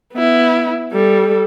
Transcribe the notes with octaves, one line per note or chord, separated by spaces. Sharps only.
B3 E4
G3 A4